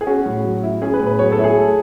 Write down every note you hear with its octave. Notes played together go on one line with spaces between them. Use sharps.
G#4
C#4 F#4
A2
F#3
E4
C#4 G#4
B4
A2
B4
F#3 C#5
A4
E4
G#4
A3